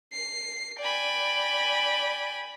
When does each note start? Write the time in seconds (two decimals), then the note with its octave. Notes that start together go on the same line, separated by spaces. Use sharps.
0.13 C7
0.79 D5 G5 G#5 B5